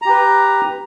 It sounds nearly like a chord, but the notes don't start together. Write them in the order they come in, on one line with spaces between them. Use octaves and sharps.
A#5 G4 B4